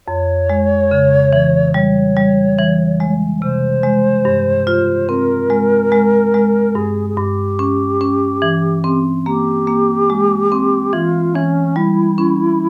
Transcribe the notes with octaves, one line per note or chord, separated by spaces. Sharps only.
F2 C#5
G#3
C#3
E3
G3 C#5
G3
E3
G#3
C3 C5
G#3
G2
F4
C4 A#4
G#3
G#3
G#3
G2 G#4
G#4
G2 G4
C#4
C#4
E3
C4
A#3 G4
A#3
G#3
C4
E3 F4
E3 C#4
G3 E4
C#4